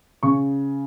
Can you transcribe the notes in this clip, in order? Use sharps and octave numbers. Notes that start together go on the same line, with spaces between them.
C#3 C#6